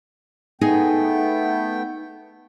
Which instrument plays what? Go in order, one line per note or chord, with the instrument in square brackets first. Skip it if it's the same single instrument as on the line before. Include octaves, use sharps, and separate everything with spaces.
[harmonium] A3 B3 G5 [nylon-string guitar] D#4 G#4 D#5